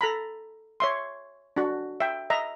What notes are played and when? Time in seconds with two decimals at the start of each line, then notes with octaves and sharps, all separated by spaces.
0.01 A4 A#5 B5
0.80 C#5 E5 C6
1.56 D4 F#4
2.00 E5 G5
2.30 D#5 E5 A#5